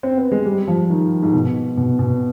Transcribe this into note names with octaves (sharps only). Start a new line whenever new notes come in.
C4
B3
G#3
G3
F3
D#3
G#2
B2
B2
B2